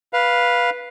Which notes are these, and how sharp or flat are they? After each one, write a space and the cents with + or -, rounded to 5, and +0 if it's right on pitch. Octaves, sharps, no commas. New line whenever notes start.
B4 -10 F5 +0